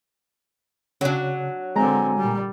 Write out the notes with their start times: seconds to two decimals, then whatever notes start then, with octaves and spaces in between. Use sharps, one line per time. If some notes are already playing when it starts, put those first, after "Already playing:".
1.01 C#3 F#3 D4
1.76 D3 G#3 C4 G#5 A#5
2.18 A#2 G3